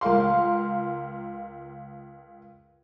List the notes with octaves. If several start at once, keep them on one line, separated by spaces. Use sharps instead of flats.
C#2 A#4 F5 C6